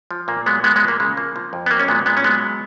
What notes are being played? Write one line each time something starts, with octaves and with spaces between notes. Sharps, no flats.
F3
A#2 A#3
F#3 G#3 B3
F#3 G#3 B3
G#3 B3
A#2
A#3
C#3 G#3
F3 A#3
F3
F2
B3
F#3 A#3
C#4
A#2 G#3 B3
A#2 G#3 B3
C#4
F#3 G#3 B3